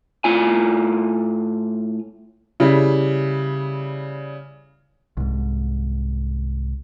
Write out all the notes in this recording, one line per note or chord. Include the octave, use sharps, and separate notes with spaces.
A2 F4 G#5
C#3 G3 E4
C2 G#2